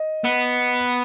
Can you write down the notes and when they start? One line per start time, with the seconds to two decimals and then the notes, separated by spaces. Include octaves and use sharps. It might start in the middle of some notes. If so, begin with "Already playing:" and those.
Already playing: D#5
0.24 B3